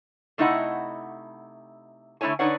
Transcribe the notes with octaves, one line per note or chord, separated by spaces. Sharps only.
C3 A3 D#4 E4 D#5 F#5
D3 A3 C#4 E4 C#5 G#5
D3 D#4 B4 C#5 D5 F#5